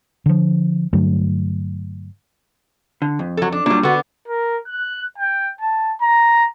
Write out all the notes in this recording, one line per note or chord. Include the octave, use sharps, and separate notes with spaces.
D3 F3
G2 D3 F#3 A3
D3
F2
F#3 A4
D4
A#2 F#3 G3 D4
D3 B3 F#4
A#4
F#6
G5
A5
A#5